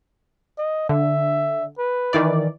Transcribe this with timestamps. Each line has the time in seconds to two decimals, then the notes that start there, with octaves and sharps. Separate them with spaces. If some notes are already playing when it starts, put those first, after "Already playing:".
0.58 D#5
0.89 D3 E5
1.78 B4
2.13 D#3 E3 D5